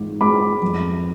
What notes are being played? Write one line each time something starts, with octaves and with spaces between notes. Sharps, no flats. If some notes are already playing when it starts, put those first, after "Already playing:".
Already playing: G#2 E3 D6
G#3 B5 D6
F2